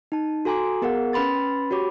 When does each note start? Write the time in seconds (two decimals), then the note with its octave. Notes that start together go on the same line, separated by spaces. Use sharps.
0.12 D#4 A5
0.45 F#4 A4 G#5 A#5 C6 D6
0.82 B3 G#4 A#4 F5 F#5
1.13 C#4 B4 B5 C6 A6
1.71 F#4 G4 C#5 B5 D6